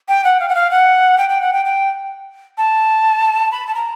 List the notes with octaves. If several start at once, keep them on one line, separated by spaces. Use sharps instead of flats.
G5
F#5
F5
F#5
F5
F#5
G5
G5
F#5
G5
G5
A5
B5
A5
A#5